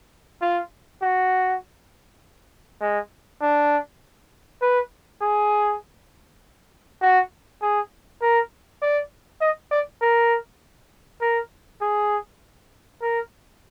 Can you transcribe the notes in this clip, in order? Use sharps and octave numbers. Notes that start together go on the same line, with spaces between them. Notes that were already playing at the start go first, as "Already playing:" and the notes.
F4
F#4
G#3
D4
B4
G#4
F#4
G#4
A#4
D5
D#5
D5
A#4
A#4
G#4
A#4